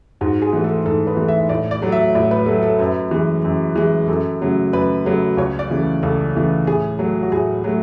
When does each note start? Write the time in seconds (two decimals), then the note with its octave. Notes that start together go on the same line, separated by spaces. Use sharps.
0.21 G#2 F#4
0.42 G#4
0.53 E3 A3
0.64 A4
0.86 G#2 A4
1.07 B4
1.17 E3 A3
1.28 E5
1.49 A2 D5
1.71 D5
1.82 F#3 A3
1.92 E5
2.15 A2 D5
2.31 B4
2.46 F#3 A3 A4
2.63 A4
2.79 F#2 B4
3.11 E3 G#3
3.44 F#2
3.76 E3 G#3
4.08 F#2 A4
4.41 C#3 F#3 A3
4.73 F#2 B4
5.05 C#3 F#3 A3
5.37 C#2 C#5
5.59 D5
5.70 C#3 E3 A3
6.03 C#2 A4
6.35 C#3 E3 A3
6.67 A2 G#4
6.99 F#3 A3
7.23 F#4
7.32 A2 G#4
7.64 F#3 A3